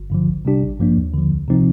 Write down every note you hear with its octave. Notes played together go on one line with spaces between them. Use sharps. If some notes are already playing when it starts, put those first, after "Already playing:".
Already playing: G1
G2 D3 F3
C2
C3 G3 D4 G4
A1
G2 F3 A#3 D4
D#2
D3 F3
C2
C3 F3 C4 D#4